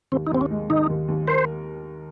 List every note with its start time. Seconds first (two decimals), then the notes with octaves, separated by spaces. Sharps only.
0.12 D#2 C4
0.27 D#4
0.31 D#2 C4
0.41 C#4
0.50 G#3
0.69 D#3 D#4
0.89 D#2
1.08 D#2
1.28 A#4 C5